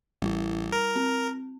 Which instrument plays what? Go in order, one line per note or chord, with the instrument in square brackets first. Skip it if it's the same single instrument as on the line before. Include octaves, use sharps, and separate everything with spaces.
[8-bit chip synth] A1 [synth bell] G3 E4
[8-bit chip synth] A#4
[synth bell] C4